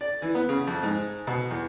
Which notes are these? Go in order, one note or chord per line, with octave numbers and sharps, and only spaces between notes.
D5
E3
B3
C#3
F2
G#2
B2
E2